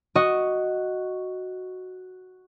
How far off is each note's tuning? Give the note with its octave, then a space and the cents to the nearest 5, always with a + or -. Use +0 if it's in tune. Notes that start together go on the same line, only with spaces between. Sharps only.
F#4 +0 D#5 +0